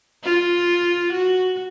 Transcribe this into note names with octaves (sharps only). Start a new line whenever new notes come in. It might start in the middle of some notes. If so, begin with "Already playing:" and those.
F4
F#4